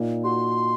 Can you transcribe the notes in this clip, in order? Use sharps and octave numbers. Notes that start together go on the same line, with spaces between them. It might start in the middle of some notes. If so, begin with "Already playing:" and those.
Already playing: A#2 D#4
F#4 C6